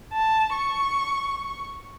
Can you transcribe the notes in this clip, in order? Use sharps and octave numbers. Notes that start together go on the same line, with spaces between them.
A5
C#6